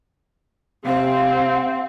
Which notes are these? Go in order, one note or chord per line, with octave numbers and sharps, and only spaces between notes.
C3 C4 F5